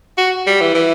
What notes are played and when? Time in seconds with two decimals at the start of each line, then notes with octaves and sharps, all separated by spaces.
0.18 F#4
0.47 G3
0.61 E3
0.75 E3